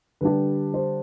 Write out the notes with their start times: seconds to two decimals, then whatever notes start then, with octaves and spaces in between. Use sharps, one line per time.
0.21 D3 G3 D4 G4 B4
0.74 C5